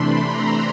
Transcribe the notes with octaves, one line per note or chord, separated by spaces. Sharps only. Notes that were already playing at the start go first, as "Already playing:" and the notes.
Already playing: C3 E3 A3 D4 B5 C6
A#5